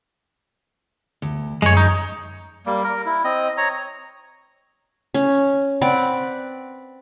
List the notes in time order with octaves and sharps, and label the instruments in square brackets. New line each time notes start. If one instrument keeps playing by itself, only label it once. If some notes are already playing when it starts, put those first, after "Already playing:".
[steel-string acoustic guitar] D2
[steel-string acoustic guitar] F#2 [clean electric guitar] G#3 C#5
[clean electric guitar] D#4
[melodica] G3 A#3
A#4
E4
C4 D#5
C#5 A#5
[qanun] C#4
C4 B4 D5 F#5